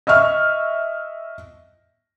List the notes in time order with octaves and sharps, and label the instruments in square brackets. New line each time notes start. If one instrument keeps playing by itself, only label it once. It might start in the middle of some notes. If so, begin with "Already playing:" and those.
[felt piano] D#5 E5 C#6 F6